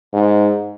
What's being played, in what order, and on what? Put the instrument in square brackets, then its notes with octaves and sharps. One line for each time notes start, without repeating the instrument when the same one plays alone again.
[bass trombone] G#2